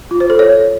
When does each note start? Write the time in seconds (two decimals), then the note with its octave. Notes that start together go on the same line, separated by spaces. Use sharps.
0.11 F4
0.20 C5
0.30 A4
0.39 C#5